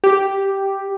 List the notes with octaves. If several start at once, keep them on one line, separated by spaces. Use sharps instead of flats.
G4